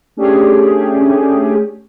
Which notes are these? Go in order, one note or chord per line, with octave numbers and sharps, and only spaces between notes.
A3 C#4 D4 G4 G#4